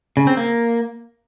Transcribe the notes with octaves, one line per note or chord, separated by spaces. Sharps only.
C#3
C4
A#3